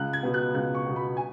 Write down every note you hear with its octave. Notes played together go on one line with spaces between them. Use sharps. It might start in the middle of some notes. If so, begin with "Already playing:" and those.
Already playing: C#2 F#6
G#6
B2 B3
F#6
C#2 F#6
C#6
B2 B3
B5
G#5